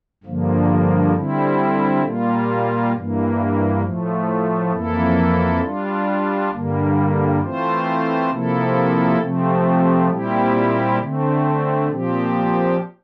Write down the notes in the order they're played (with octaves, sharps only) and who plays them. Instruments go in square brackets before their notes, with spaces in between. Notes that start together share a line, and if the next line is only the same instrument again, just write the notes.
[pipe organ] G2 D3 F3 A#3
D3 G3 C4 E4
A#2 G3 A#3 F4
G2 E3 A#3
A2 F3 A3
F2 E3 A#3 E4 A4
G3 D4 F4
G2 D3 G3 A#3
E3 A3 C4 F4 C5
C3 F3 A#3 E4 A4
C3 F3 A3 C4
A#2 G3 C4 E4 G4
D3 A3 C4
A#2 F3 C4 G4